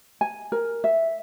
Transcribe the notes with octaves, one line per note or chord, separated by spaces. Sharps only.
G#5
A#4
E5